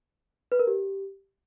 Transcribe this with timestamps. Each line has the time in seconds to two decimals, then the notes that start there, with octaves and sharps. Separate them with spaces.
0.52 B4
0.59 A#4
0.67 G4